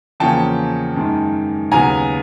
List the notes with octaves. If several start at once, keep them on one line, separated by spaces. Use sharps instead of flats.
E2 C#3 F3 A#3 C#4 G5 A5
F#2 D#3 G#3
D#2 C#3 F#3 B3 G#5 A#5